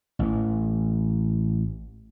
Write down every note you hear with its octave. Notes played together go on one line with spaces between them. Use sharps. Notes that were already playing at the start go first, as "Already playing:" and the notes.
A1 E3